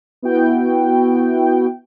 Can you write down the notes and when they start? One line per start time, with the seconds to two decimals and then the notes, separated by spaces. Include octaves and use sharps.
0.22 B3 E4 F#4 G5